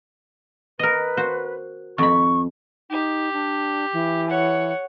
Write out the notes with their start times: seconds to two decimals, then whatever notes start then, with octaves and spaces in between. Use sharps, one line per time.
0.79 A#4 B4 D#5
1.17 F#4 C5
1.98 F2 B5 C#6
2.90 D#4 G4
3.33 D4
3.93 E3
4.29 C#5 F#5